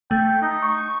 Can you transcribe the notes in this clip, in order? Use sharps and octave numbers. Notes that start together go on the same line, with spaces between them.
A3 G5
D#4
C#6